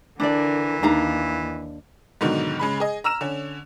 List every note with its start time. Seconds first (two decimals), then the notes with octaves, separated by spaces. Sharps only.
0.20 D3 E3 D4 A#4 D5
0.83 D#2 D4 D#4 F5 A#5
2.21 G#2 B2 D3 D#3 F#3
2.59 C#3 G#3 B5
2.80 G#4 D#5
3.04 A#5 E6 F6 E7
3.21 D3 C#4